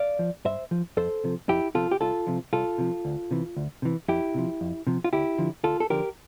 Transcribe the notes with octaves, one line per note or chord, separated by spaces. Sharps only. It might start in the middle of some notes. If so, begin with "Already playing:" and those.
Already playing: D5 F5
F3
G2 C5 E5
F3
F2 A4 C5
C3 F3
F2 E4 G4
C3 F3 F4 A4
G4
C2 F4 A4
C3 F3
C2 F4 A4
C3 F3
D2
C3 E3
D2
C3 E3
F2 E4 G4
C3 F3
F2
C3 F3
F4
D2 E4 G4
D3 F3
D2 F4 A4
A4
D3 F3 G4 A#4